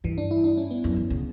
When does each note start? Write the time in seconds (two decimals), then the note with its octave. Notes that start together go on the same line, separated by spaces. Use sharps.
0.04 G2 E3
0.18 D4
0.31 E4
0.44 D4
0.57 C#4
0.71 B3
0.84 F#2
0.96 E3
1.10 C#3